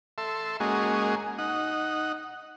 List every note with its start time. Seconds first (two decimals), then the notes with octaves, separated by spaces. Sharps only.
0.18 A4 E5 C6
0.60 G#3 A#3 C#4 F#4 G#4 D#5
1.38 D#4 F#5